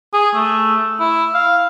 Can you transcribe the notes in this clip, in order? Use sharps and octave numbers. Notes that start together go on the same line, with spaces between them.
G#4
A3
E4
F5